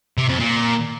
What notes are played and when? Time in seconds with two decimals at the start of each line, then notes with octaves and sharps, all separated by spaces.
0.18 C3
0.28 F2
0.39 A#2